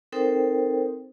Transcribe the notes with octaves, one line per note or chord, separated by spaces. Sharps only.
C4 D#4 A4 A#4 C5 G5